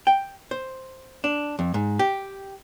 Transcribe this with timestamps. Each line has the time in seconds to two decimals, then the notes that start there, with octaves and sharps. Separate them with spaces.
0.07 G5
0.51 C5
1.24 D4
1.59 F2
1.74 G#2
1.99 G4